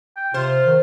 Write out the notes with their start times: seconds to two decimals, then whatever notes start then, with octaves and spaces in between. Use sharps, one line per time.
0.17 G5
0.34 C3 F4 C5
0.66 D#3